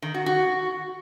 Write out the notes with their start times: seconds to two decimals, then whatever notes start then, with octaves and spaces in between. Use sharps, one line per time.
0.02 D#3
0.14 F#4
0.26 F#4